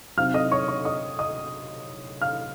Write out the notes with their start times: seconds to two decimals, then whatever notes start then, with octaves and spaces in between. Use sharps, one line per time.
0.17 C3 F#3 C4 D#4 F5 F6
0.34 D#5 D#6
0.52 C#5 C#6
0.68 C#5 C#6
0.85 D#5 D#6
1.19 D#5 D#6
2.22 F5 F6